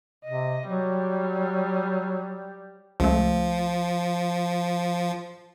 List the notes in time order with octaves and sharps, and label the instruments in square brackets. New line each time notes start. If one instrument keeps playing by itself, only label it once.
[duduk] C3 [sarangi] D#5
[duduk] F#3 [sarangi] G3
[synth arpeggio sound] C#2 A3 [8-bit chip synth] F3